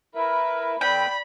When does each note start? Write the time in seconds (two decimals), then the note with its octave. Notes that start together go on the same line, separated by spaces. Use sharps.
0.15 E4 A#4 B4 E5 B5
0.81 F2 C4 B4 D5 G5 B5